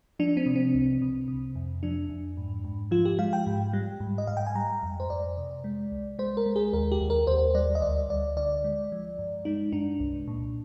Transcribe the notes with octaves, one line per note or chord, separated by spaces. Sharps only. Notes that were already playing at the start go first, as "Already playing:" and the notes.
F3 D4
C4
C3
C4
C2
C3
C3
F2
F3 D4
F2
G#2
G#2
F3 F4
G4
G#3 F5
G5
G#2
G3
G#2
D#5
G#2 F5
G5
G#5
G3 A#5
F2
C5
F2 D5
C3
G#3
C2
G#3 C5
A#4
G#3
G#4
D#2 A#4
G4
D#2
A#4
D#2 C5
G3 D5
D#5
D2 D5
D2 D5
D3 D5
G#3
F3
G2
G#3 D#4
G2 D4
C2
A#2